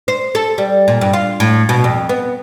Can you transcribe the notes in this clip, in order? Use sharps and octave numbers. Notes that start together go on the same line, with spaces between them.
C5
A4
G3
A#2
G2
F4
A2
B2
F2
B3